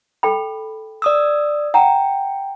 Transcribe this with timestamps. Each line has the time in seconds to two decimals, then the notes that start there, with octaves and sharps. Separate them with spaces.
0.23 A4 G5 B5
1.02 D5 D#6 E6
1.74 F#5 G5 A#5